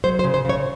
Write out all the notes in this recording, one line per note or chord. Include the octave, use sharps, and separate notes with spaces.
F#3 C5
C5
C#3
C5
C#3 C#5